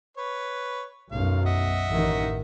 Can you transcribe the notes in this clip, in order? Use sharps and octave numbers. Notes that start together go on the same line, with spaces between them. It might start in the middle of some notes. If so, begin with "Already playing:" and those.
B4 C#5
B1 F#2 F5
D#5 E5 F#5
A1 D#3